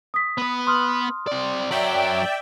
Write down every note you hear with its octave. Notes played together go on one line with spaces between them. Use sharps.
D#6 B6
B3 B4
C6 D#6 F6
C4 D5
F#2 F#3 D5 E5 G5